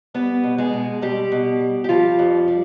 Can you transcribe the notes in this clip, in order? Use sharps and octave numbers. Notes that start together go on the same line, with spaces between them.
G3 B3 B4
B2
G#3 G#4
B2
B2 G3 G4
B2
G3
G4
F3 G3 F4
F2
G3